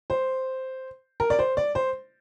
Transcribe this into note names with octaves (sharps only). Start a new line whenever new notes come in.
C5
A#4
D5
C5
D5
C5